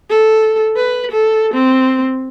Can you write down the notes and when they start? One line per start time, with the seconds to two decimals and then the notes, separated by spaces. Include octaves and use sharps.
0.10 A4
0.76 B4
1.12 A4
1.54 C4